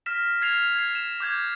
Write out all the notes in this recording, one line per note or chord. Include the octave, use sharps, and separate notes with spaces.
F6 A#6 B6 E7
F6 G#6 C7 F7
G#6 C7
E7
D6 G6 G#6